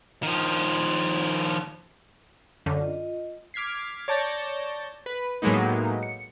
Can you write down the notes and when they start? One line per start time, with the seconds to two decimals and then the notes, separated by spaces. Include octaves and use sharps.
0.23 D#3 F3
2.66 F#2 D3 D5
2.81 F4 D#5
3.54 D6 F6 G#6 B6 C7
4.08 C#5 D5 A5 G6 A#6
5.06 B4
5.42 A2 F#3 G#3 A#3 B3 D#4
6.03 C#7